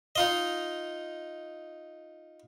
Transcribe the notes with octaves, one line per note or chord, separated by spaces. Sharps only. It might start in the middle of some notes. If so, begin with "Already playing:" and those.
D#4 F4 D#5